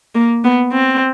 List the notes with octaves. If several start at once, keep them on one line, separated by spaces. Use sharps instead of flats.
A#3
B3
C4